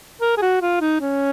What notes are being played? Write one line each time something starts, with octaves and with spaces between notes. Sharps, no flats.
A#4
G#4
F#4
F4
D#4
C#4